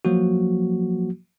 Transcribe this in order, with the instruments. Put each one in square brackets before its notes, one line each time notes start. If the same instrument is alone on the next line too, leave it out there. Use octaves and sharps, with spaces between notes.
[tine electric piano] F3 F#3 A#3 F#4